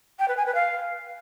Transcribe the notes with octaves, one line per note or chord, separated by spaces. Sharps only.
G5
B4
G#5
B4
F5